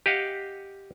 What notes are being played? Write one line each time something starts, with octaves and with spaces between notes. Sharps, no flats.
G4 D#5 F5 F#5